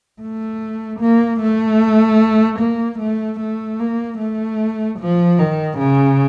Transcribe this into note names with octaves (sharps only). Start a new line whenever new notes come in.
A3
A#3
A3
A#3
A3
A3
A#3
A3
F3
D#3
C#3